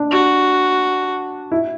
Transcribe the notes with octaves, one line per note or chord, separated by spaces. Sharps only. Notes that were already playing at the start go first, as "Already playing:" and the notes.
Already playing: D4
F#4
E4